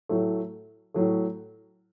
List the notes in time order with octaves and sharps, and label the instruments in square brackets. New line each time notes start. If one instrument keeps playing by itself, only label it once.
[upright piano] A2 F#3 A3
A2 F#3 A3